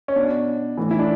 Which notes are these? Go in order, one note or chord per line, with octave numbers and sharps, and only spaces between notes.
C#4
B2 D4
A2 E3
E4
D4